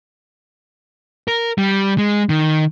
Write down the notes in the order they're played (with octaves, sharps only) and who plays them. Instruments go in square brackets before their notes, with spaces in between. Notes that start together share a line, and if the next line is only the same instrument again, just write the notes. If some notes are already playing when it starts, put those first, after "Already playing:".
[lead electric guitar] A#4
G3
G#3
D#3